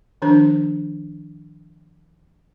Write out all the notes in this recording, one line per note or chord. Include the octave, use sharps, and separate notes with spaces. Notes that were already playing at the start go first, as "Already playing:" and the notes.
D#3 F3 D4 C5